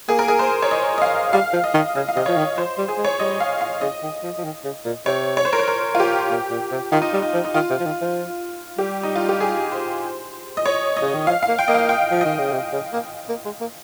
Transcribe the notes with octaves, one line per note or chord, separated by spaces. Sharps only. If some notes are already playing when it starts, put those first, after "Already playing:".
A#3 G#4
A#4
G#4
C5
C#5
D#5
D#5
F5
G3 F5
F3
D#5
D#3
C#3 D#5
F5
C3 D#5
F3 C#5
D#3
F3 C5
G3
G#4
G#3
C#5
G3 D#5
F5
F5
C#3 D#5
D#3
F3
F3
D#3
C#3
A#2
C3 C#5
C#5
C5
A#4
C5
A#4
F4
G4
A#2
A#2
C3
D#3 F4
D#4
G3
D#4
F3
D#4
D#3 F4
C3
F3
D#3
F3
G3 G4
D#4
F4
G4
G#4
C5
D#5
C#5
D#5
C#3
D#3
F3 F5
F5
A#3
G5
A#3 D#5
F5
G5
F3
D#3 D#5
C#3
C3
C#3
A#3
A#3
G#3
A#3